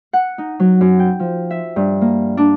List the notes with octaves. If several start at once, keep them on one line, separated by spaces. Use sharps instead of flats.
F#5
D#4
F#3
F#2
G5
F3
E5
G2
A#3
D4